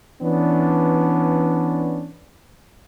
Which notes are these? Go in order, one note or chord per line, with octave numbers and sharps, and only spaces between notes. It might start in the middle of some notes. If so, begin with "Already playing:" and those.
E3 B3 C#4 D4